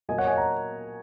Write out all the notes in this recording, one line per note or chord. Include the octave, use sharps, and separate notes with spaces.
A#2 F#3 A#3 D#5 G#5
C#5 F#5
D#5 G#5
F#5 A#5